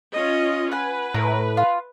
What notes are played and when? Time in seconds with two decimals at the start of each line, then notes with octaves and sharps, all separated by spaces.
0.12 C#4 F4 D#5
0.71 B4 F#5 G#5
1.14 A2 A#4
1.57 F4